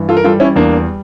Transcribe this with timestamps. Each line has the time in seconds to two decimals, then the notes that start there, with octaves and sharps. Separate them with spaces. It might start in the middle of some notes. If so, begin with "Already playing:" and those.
Already playing: G2 E3
0.09 F4 A4
0.17 A#4
0.24 G3 F4 A4
0.40 C#4 E4
0.56 E2 A#3 D4